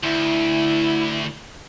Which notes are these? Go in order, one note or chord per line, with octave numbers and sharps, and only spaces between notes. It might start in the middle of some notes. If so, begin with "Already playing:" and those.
D2 E4